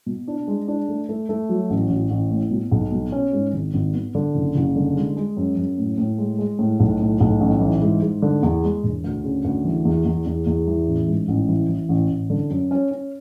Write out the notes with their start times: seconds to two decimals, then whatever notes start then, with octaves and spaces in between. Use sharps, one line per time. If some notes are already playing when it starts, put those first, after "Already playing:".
0.06 B2
0.28 D4
0.48 G#3
0.68 D4
0.89 A3
1.09 A3
1.29 A3
1.49 F#3
1.70 A1
1.90 A1
2.10 A1
2.31 A2
2.51 B2
2.72 B1
2.92 B2
3.12 C#4
3.33 G#2
3.54 G#1
3.74 G#1
3.94 B3
4.15 D3
4.35 F#1
4.56 F#1
4.76 D3
4.96 G#3
5.17 G#3
5.37 F#2
5.57 F#2
5.78 A2
5.98 A2
6.18 G#3
6.39 G#3
6.59 A2
6.80 B1
7.00 A2
7.20 B1
7.40 A1
7.61 E3
7.82 G#2
8.02 G#2
8.22 D3
8.43 E2
8.63 G#3
8.83 E1
9.04 D2
9.24 C#3
9.44 D2
9.65 E3
9.85 E2
10.05 E2
10.26 E2
10.47 E2
10.67 E3
10.87 A1
11.08 G#2
11.28 A1
11.49 E3
11.69 E3
11.89 A1
12.10 A1
12.30 D3
12.50 F#2
12.71 C#4
12.91 C#4